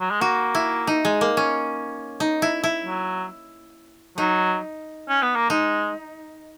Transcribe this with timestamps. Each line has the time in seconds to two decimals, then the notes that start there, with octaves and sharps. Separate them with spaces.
0.01 F#3
0.11 G#3
0.21 A#3 F#4
0.55 E4
0.87 D#4
1.05 G#3
1.21 A#3
1.37 C#4
2.20 D#4
2.42 E4
2.64 E4
2.85 F#3
4.18 F#3 D#4
5.09 C#4
5.23 B3
5.36 A#3
5.50 G#3 D#4